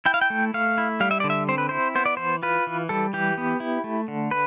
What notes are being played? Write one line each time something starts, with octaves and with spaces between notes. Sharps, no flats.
E4 G5
F5
G5
A3
A3 F5
E4
G3 F5
E5
D3 D5
E5
C4 C5
B4
E4 C5
B3 C5
D5
E3 C5
F4 B4
E3
G3 A4
E3 G4
B3
E4
A3
D3
B4